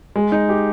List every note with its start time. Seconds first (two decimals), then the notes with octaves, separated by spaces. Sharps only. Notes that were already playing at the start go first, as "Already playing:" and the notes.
0.16 G#3
0.32 D#4
0.49 G4